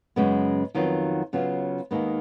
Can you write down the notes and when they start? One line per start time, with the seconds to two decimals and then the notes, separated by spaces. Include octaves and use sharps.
0.16 F#2 C#3 G#3 B3
0.74 F2 D#3 F#3 B3 F4
1.33 C#3 F#3 B3 F4
1.91 D#2 D#3 G#3 B3